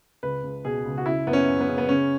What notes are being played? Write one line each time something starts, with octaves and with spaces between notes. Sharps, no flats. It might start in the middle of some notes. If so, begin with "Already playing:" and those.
C#2 B4
C#2
B2 G#4
C#2
F#4
C#3 E4
F#2 B3
C#4
F#2
B3
C#3
B3
C#3 C#4